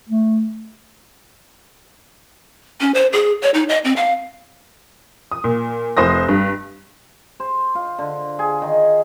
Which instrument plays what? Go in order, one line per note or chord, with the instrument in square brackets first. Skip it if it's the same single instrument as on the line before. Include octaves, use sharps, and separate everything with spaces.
[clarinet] A3
[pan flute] C#4
C5
G#4
C#5
D#4
D#5
C4
F5
[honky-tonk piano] D#6
A#2
F1 C5 D#6 A#6
G2
[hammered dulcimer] C5
F4
D3
G#4
D#3